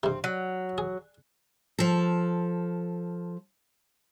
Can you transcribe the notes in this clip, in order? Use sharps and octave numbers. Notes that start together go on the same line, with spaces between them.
G2 C3 C4
F#3
G#4
F3 A4